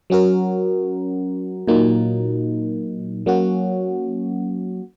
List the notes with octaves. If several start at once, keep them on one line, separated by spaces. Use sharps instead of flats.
F#3 C#4 F#4 A#4
A#2 F#3 A#3 D#4
F#3 A#3 C#4 F#4